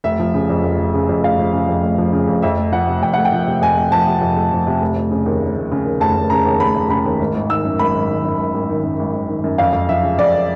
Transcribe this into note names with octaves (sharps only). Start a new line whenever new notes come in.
F1 E5
F3
C#3
F2
F1
F3
C#3
F2
F1 F5
F3
C#3
F2
F1
F3
C#3
F2
F2 E5
A3
F3 F#5
C3
F2 G5
A3 F#5
G5
F3
C3
F2 G#5
A3
F3 A5
C3
F2
A3
F3
C3
F1
F1
C#3
D#2
F1
F1
C#3
D#2
F1 A5
F1
C#3 A#5
D#2
F1 B5
F1
C#3 B5
D#2
G#1
G#1
D#3 E6
F#2
G#1 B5
G#1
D#3
F#2
G#1
G#1
D#3
F#2
G#1
G#1
D#3
F#2
F2 F5
F2
F3 E5
C#3
F2 D5